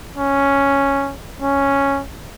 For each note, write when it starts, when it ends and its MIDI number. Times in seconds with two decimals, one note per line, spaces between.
0.17 1.14 61
1.42 2.02 61